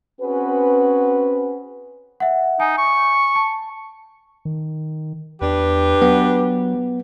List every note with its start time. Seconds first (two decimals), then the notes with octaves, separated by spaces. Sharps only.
0.21 C4 C#4 F#4 G#4 B4
2.20 E5 F#5
2.60 D#4 G#5
2.79 C#6
3.36 A5
4.45 D#3
5.41 E2 D4 G4 B4
6.02 F#3 B3